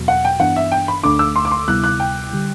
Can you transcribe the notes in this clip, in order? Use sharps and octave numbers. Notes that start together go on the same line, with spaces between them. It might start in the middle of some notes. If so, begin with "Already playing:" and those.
Already playing: E2 B2 F#3 B3 F#4
F#5
G5
G2 E3 B3 D4 F#5
E5
G5
B5
D2 D3 A3 D4 A4 D6
E6
C6
D6
C6
D2 C3 G3 B3 E4 F#6
F#6
G5
D3 G3